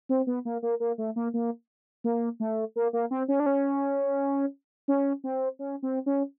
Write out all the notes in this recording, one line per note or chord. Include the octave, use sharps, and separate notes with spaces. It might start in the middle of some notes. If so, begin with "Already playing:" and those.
C4
B3
A#3
A#3
A#3
A3
A#3
A#3
A#3
A3
A#3
A#3
C4
C#4
D4
C#4
C#4
C4
C#4
C4
C#4